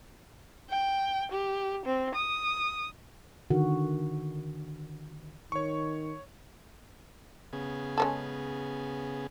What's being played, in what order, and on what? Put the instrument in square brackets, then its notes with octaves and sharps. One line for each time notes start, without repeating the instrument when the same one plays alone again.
[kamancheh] G5
G4
C4
D#6
[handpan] D3 D#3 F#4
[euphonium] D#3 [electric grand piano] C#5 C#6
[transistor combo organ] C#3 B3 G#4
[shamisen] G#3 C#4 A4